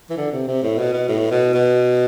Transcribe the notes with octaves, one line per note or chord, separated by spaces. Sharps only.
E3
D3
C3
C3
A2
B2
B2
A2
B2
B2